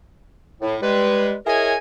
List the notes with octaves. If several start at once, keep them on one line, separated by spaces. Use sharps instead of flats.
A2
G3 G#3 B4
E4 G#4 A#4 C#5 D#5 G#5